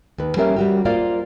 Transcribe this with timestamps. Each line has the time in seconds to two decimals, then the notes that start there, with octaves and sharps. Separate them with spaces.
0.18 D#2 B4
0.36 G3 A#3 C#4 G4 A#4 E5
0.56 G3 F#4 G4
0.85 A#3 F4 C5 D5 F5